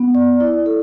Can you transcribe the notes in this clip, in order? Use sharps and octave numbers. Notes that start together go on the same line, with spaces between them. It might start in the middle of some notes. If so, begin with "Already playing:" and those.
Already playing: B3
D5
E4
A4